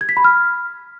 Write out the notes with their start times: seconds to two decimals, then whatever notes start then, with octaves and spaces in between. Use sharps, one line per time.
0.01 G#6
0.09 B6
0.17 B5
0.24 F6